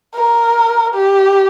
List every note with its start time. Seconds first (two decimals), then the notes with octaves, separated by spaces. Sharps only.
0.15 A#4
0.95 G4